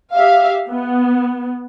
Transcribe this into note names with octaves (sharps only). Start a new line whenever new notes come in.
G4 E5 F5
B3